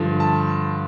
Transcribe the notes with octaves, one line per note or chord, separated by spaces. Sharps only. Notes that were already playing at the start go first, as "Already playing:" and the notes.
Already playing: G2 D3 F3
A5